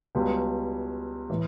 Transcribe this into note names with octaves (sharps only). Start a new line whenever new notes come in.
C#2 B2 G3
A2 E3